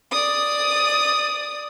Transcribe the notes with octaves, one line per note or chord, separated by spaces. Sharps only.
D5 D#6